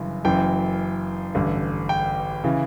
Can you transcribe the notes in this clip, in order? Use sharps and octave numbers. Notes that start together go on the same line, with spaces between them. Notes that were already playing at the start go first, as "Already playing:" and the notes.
Already playing: G1 F#2 C#3 E3
F#1 F#2 E3 G5
A1 G2 D3
G5
C#3 E3